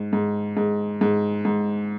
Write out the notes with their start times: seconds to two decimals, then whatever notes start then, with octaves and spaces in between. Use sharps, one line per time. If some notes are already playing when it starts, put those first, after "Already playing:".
Already playing: G#2
0.13 G#2
0.57 G#2
1.01 G#2
1.45 G#2